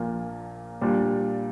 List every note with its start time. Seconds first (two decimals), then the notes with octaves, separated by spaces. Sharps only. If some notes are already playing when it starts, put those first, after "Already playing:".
Already playing: A#1 A#2 A#3 F4
0.81 A#2 G3 D4 F4